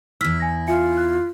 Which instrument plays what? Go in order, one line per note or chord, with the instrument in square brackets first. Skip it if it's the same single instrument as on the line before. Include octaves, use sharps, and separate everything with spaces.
[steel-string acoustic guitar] E2 E4 [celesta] E6 F6 B6
[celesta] G#5 A#6
[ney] F4 [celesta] E5 G#5 C#7
[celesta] F#6